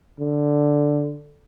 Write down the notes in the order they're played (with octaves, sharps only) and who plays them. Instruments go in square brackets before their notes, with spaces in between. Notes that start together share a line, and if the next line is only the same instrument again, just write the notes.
[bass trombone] D3